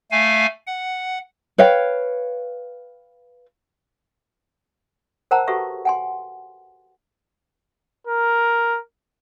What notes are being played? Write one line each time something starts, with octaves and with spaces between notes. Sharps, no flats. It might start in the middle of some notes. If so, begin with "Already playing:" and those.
A3 F5 G#5
F#5
B4 C#5 F5 G5
A#4 C5 F#5 A5 A#5 E6
F#4 G4 A4 B4 E5 C#6
F#5 G#5 C6
A#4